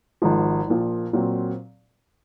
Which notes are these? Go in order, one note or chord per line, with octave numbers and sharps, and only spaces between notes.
G#1 G#2 F3
A#1 A#2 F3
A#2 F#3 C4